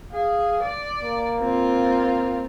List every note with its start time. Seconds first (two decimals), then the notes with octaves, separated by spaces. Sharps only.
0.13 G#4 F5
0.63 D5
1.03 A#3
1.40 C4 F4